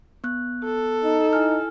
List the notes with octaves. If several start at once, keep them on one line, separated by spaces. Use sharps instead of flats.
B3 F#6
A4
D#4
E4 G#5 F6